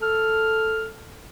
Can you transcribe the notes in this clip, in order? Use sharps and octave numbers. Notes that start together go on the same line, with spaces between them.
A4 F6